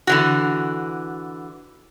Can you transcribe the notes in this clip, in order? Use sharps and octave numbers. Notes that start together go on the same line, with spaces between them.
D3 E3 F#4